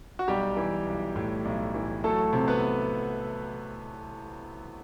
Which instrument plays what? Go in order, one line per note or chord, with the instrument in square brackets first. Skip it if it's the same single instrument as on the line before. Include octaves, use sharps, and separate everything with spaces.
[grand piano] F#4
B1 G3 G4
E3
B1
A2
B1
E3
F#3 A3 A4
C3
B3 B4